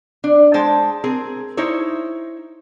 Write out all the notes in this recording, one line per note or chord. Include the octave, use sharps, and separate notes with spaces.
D4
G#3 C5 G5 A5
C4 G#4 A#4
D#4 E4 C5 C#5